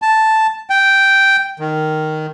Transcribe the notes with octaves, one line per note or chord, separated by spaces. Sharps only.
A5
G5
D#3